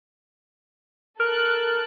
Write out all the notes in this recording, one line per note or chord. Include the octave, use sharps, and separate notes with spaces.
A4 A#4 F6 F#6